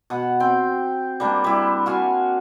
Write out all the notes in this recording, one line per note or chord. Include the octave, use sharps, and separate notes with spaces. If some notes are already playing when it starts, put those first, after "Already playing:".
B2 F#5
C4 G5
G3 A#3 D4
G3 E4
F#4 F5 G#5